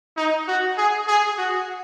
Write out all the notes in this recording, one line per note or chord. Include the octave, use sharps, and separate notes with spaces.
D#4
F#4
G#4
G#4
F#4